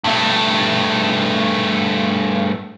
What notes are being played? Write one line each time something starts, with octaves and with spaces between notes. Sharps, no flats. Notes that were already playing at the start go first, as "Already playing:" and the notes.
G2 A3